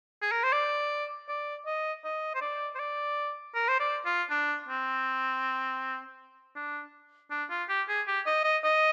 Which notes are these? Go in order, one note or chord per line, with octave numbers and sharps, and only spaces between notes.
G#4
A#4
C5
D5
D5
D#5
D#5
C5
D5
C5
D5
A#4
C5
D5
F4
D4
C4
D4
D4
F4
G4
G#4
G4
D#5
D#5
D#5